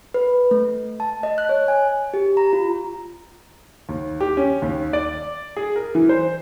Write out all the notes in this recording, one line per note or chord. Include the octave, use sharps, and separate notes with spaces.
B4
A3
A5
D#5
F#6
C#5
G#5
G4
A#5
F4
D#2
G4
C#4
D#2
D5
G#4
A#4
E3
C5